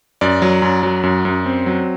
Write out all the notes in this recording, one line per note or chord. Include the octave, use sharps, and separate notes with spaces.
F#2 D5
F#3
F#2
F#3
F#2
F#2
C4
F#3